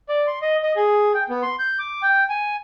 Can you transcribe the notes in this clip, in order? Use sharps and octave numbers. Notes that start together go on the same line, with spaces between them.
D5
C6
D#5
D#5
G#4
G5
B3
C6
G6
D6
G5
G#5